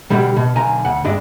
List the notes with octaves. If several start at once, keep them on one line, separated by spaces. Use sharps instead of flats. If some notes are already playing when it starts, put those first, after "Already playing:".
B2 D3 G3
B2
B1 D3 G#5 A#5
D2 F#5
G2 G#3 D4